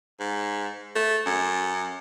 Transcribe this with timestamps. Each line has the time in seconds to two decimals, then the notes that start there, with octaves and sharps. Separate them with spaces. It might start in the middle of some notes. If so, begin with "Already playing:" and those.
0.20 G#2
0.95 A3
1.26 F#2